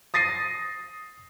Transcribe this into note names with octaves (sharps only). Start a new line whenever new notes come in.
D#6 A6 A#6 C7 D#7